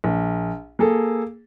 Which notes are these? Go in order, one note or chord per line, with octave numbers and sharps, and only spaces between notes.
A#1
A#3 G#4 A4